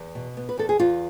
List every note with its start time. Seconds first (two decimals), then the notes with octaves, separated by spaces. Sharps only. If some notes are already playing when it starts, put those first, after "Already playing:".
Already playing: E2
0.15 B2
0.37 B3
0.49 B4
0.57 E2 A4
0.69 G#4
0.80 E2 F4